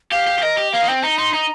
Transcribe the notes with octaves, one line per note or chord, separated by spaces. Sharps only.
G4 F5
G4
G4
A#4 D#5
G4
A#3 F5
D#4
C4 G5
D#4 A#5
D#4 C6
D#4 A#5